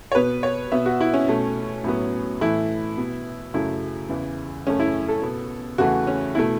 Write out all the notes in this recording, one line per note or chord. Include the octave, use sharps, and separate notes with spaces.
C#5
B2 B3 B4
C#5
B2 B3 E5
F#4
E4
C#4
B2 A3
A2 F#3 B3
A2 E3 A3 E4
B2 B3
F#2 C#3 F#3 A3 E4
E2 C#3 E3
F#2 C#3 A3 C#4
E4
A4
B2 B3
E2 C#3 E3 A3 F#4
C#4
B2 A3 E4